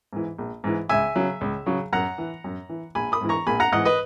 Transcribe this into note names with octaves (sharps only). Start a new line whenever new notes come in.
G#2 E3
A#1
G#2 E3
C#2 E5 G#5
C#3 F#3
C#2
C#3 F#3
F#2 F#5 A#5
E3
F#2
E3
A#1 G#5 B5
B5 D#6
G#2 E3
A#5 C#6
A#1 G#5 B5
F#5 A#5
G#2 E3 D#5 F#5
B4 D#5